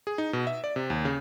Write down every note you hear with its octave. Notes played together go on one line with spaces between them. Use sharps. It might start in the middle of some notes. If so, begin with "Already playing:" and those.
G#4
D#4
B2
E5
D5
C3
D#2
C#3